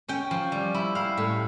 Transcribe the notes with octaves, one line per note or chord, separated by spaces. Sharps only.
C#4 G5
F3
G3
E4
E4 F5
A2